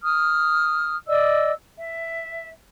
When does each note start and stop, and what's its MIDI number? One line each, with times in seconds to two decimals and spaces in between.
0.03 0.96 87
0.03 0.96 89
1.08 1.51 74
1.08 1.51 75
1.08 1.51 88
1.78 2.49 76